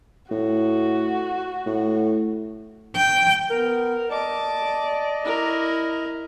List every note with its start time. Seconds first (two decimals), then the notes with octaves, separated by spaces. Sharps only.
0.31 A2 F#4
1.66 A2
2.95 G5
3.50 B3 A#4
4.10 D5 D#5 A5 D6
5.22 E4 A#4